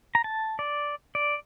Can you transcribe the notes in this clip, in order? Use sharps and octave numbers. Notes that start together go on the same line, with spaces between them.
A#5
A5
D5
D5